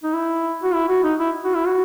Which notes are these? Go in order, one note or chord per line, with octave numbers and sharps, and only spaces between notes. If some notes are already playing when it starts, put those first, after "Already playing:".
D#4
E4
F#4
E4
F#4
D#4
E4
F#4
E4
F#4